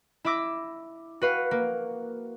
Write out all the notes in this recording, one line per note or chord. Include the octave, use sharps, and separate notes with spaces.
E4 E5 D6 E6 A#6
F#4 B4 F5
A#3